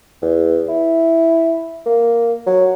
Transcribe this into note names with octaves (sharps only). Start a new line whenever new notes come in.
E2
E4
A#3
F#3